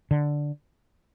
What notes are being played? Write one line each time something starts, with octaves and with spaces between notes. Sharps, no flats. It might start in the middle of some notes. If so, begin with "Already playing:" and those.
D3